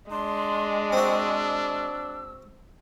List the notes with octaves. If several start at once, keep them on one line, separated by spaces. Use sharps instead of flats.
G#3 D4 C6
C4 F#4 E6